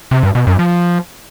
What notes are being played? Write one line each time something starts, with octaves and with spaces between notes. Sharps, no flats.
C3
G2
B2
F#2
F3